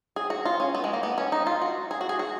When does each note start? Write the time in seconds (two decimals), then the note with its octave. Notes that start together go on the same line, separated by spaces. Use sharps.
0.16 G#4
0.30 F#4
0.45 F4
0.60 C#4
0.75 B3
0.84 G#3
0.93 A#3
1.03 B3
1.18 C#4
1.32 D#4
1.47 F4
1.62 F#4
1.91 G#4
2.01 F#4
2.09 G#4
2.19 F#4